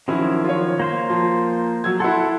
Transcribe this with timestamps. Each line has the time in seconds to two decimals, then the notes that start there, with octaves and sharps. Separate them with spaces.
0.08 D#3 F3 F#3 C#4 E4
0.44 F4 C#5
0.80 A#3 C5 C6
1.10 F3
1.84 F#3 E6 G#6
2.00 E4 A4 F#5 C6